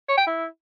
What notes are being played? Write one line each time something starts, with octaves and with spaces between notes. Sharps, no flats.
C#5
G5
E4